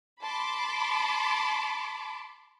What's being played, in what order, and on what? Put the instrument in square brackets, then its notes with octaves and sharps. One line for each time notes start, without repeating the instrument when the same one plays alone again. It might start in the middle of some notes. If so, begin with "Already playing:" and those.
[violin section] A5 B5 C6 D6